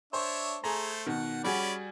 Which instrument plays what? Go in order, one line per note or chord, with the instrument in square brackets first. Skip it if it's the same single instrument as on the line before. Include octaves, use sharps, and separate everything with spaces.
[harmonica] D4 C#5 E5 [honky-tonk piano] C5
[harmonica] A3 C5 [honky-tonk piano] G#4 A#5
[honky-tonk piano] B2 D#3 [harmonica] F#5
[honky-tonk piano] G3 F#4 G#4 [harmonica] C#4 D5 B5